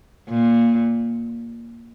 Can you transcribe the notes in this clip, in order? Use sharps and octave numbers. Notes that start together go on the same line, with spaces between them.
A#2